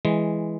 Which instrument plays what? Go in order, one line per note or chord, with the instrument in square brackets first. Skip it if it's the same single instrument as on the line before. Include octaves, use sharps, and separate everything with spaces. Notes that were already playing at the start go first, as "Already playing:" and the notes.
[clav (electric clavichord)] E3 G#3